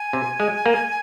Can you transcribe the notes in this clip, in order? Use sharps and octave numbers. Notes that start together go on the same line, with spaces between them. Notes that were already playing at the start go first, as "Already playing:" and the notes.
Already playing: G#5
C3
G#3
A#3